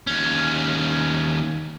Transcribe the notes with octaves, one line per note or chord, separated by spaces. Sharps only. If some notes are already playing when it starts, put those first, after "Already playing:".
D#2 C#4